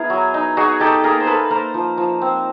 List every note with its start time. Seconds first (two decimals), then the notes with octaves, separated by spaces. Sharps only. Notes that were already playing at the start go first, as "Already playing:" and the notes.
Already playing: B3 E4 G#4 A#4
0.10 F#3
0.34 D#4
0.57 D#4 F#4 G#4
0.80 D#4 G4 A4
1.03 A#3 G#4 A#4
1.20 C5
1.27 A#3 A4 B4
1.50 A#3 A#4 C5
1.74 F3
1.98 F3
2.22 C4